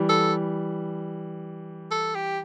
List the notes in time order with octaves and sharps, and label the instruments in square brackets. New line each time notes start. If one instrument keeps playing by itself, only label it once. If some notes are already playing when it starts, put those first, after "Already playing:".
Already playing: [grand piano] E3 G3
[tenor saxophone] A4
A4
G4